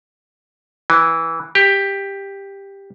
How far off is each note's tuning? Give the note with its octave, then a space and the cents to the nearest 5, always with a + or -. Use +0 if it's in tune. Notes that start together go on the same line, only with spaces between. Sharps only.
E3 -10
G4 +10